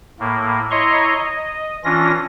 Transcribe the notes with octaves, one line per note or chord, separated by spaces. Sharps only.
A2 A#3
E4 C#5 D#5 A#5 C6 C#6
D#5
E3 C#4 D4 F4 A#6